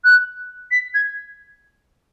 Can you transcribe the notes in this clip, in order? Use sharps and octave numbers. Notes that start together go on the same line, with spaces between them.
F#6
B6
G#6